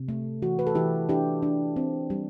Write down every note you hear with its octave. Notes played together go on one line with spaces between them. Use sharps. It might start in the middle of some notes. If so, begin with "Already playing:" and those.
Already playing: C3
A3
E3 F#4
B4
A4
E3 E4 G4
D4 E4 G4
D4
C4
G3